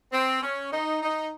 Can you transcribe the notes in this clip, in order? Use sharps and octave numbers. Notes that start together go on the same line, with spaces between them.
C4
C#4
D#4
D#4